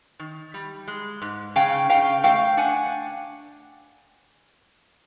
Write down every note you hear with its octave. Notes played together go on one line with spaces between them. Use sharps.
D#3
G3
G#3
G#2
C#3 F5 G5
C#3 F5 G5
A3 F5 G5
D4 F#5 G#5